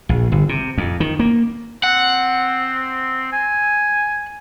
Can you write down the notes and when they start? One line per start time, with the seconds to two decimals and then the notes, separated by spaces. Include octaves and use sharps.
0.09 A#1
0.32 G1
0.49 C3
0.78 F2
1.00 D#3
1.19 A#3
1.83 C4 F#5
3.33 G#5